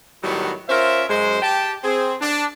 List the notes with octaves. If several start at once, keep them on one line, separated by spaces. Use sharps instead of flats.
A2 D#3 F#3 G3 B3 F#4
C#4 F4 A#4 C5 E5
F#2 G#3 C5
G4 G5 A5
C4 G#4
D4